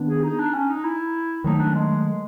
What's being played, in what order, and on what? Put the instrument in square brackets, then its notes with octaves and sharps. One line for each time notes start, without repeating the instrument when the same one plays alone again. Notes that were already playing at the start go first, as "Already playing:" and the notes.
Already playing: [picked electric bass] D#3 B3 D4
[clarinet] G#4
D#4
D4
C#4
D#4
E4
[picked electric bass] D#3 F#3 A3 [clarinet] D#4
[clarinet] D4
G#3